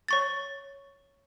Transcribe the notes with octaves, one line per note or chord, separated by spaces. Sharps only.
C#5 C#6 A6